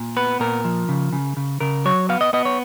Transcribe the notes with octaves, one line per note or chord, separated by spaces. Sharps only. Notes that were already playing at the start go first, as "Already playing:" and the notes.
Already playing: A#2
B3 B4
A#2 A#4
F3
C#3
C#3
C#3
C#3 A#4
F#3 C#5
B3 F5
D#5
B3 D#5
C#5